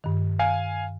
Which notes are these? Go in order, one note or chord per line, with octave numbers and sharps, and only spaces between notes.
G2 D#3
F5 G#5